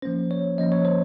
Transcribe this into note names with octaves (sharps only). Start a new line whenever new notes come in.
F3 A#3 C#4 C5
C#5
F3 A#3 C#4 D#5
C#5
C5